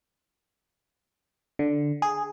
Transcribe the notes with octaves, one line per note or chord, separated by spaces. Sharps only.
D3
G#4